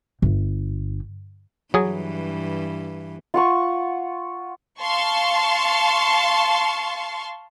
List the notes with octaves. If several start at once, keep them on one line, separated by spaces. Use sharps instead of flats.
G1
G2 E3 F#3 G#4
F4 F#5 C#6
F5 A5 C6 C#6